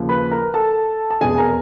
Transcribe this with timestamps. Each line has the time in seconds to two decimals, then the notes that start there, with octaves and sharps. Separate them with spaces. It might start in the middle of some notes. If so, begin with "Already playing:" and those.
Already playing: D#2 C#3 F3
0.09 B4 B5
0.31 A#4 A#5
0.54 A4 A5
1.10 A5
1.21 F1 E2 B2 G#4 G#5
1.38 A#4 A#5